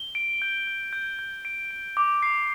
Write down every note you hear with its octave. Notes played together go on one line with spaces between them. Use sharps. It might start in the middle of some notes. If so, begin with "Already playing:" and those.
Already playing: G7
D7
G6
G6
G6
G6
D7
D7
D6
C7